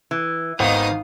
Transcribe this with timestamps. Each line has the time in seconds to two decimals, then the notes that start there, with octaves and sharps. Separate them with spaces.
0.11 E3
0.60 G#1 D#3 B3 F5 D#6